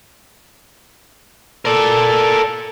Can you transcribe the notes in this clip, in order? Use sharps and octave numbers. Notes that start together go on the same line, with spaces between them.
A4 A#4 D5